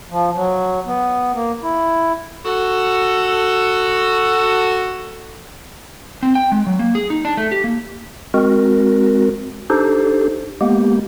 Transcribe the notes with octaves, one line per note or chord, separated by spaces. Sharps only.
F3
F#3
B3
A#3
E4
F#4 A4
C4
G5
G#3
F#3
A#3
G#4
D#4
D4
A3
G4
A#3
G#3 C4 F#4 A#4
D4 D#4 G4 A4 C5
G#3 A#3 B3 G4